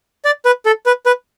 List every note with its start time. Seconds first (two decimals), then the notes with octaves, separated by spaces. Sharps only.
0.25 D5
0.45 B4
0.66 A4
0.86 B4
1.06 B4